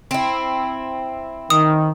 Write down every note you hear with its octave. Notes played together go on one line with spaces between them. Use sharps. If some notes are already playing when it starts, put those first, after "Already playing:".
C4 E4
D#3 D#6